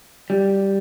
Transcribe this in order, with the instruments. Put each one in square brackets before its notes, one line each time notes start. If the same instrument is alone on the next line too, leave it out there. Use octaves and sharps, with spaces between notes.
[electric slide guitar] G3